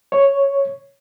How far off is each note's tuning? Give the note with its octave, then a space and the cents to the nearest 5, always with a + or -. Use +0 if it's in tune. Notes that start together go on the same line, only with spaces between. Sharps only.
C#5 +0